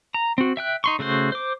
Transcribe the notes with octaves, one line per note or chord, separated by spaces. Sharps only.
A#5
C4 F#4
E5 G5 F#6
D#4 C6 C#6
C#3 A3 F#4 C5
C5 D6